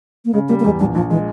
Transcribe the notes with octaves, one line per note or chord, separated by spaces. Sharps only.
A#3
C#3 G#3
G3 A#3
A#3
E2 G#3
A#1 G3
A#1 F3
E3 G#3